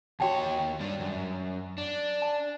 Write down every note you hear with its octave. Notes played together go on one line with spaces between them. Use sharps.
D#2 F#4 C#5 G5 A5
G2 D4
F#2
D4
A5